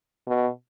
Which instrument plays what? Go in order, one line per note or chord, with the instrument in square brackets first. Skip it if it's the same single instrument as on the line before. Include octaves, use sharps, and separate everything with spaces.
[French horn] B2